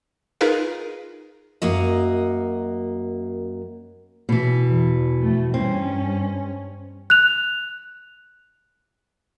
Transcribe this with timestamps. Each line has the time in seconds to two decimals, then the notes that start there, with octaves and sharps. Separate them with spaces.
0.41 D#4 F4 G#4 A#4 B4 F5
1.62 F#2 A#3 F#4 D#5
4.29 B2 E3
4.65 E2
5.18 F2 A3
5.54 G2 C4 C#4
7.10 F#6 F7